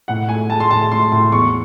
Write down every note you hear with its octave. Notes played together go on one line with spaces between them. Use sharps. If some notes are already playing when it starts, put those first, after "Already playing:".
A2 F#5
A3 G#5
A3 A5
C6
A2 A5
A3 C6
A2 C6
E2 C#6